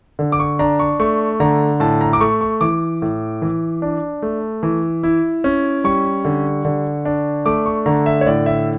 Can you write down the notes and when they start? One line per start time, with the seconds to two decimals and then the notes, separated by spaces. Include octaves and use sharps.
0.19 D3
0.32 D6
0.39 C#6
0.59 D4 A#5
0.79 C#6
0.99 A3 C#6
1.40 D3 A#5
1.80 A2 A5
2.01 A#5
2.13 D6
2.21 A3 C#6
2.41 C#6
2.61 E3 D6
3.02 A2
3.42 E3
3.82 D4
4.22 A3
4.63 E3
5.03 E4
5.44 C#4
5.84 G3 C#6
6.25 D3
6.65 D3
7.05 D4
7.46 A3 D6
7.66 C#6
7.86 D3 A#5
8.06 E5
8.21 C#5
8.27 A2 D5
8.46 E5